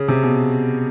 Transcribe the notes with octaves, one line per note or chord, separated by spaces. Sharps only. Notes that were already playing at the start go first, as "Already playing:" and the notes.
Already playing: C#3
C3
B2